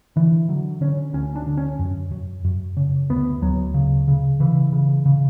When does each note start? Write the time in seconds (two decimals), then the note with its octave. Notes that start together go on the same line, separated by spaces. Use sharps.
0.16 D3 E3
0.49 D3 F#3
0.81 D3 C#4
1.13 D2 C#4
1.36 D4
1.46 D3
1.57 C#4
1.79 F#2
2.11 F#2
2.44 F#2
2.77 C#3
3.10 D2 B3
3.42 D2 F#3
3.74 C#3
4.08 C#3
4.40 C#3 E3
4.73 C#3
5.06 C#3